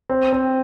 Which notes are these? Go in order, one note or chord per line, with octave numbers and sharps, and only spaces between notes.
C4
C4